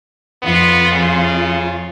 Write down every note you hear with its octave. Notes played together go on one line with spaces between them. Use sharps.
F2 B3 F4
C#3